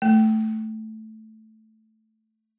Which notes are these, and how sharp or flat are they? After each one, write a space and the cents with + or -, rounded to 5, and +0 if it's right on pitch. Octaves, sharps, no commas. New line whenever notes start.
A3 -5